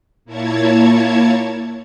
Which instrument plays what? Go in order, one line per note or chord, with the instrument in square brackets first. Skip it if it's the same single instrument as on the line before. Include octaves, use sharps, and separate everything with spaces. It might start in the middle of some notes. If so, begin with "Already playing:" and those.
[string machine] A#2 A#3 E4 C#5 A5 G#6